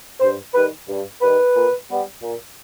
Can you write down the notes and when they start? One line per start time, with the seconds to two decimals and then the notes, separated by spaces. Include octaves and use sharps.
0.20 G2 C5
0.54 D#3 G3 B4
0.88 G2
1.21 D#3 G3 B4
1.55 A#2
1.89 G3 B3
2.22 A#2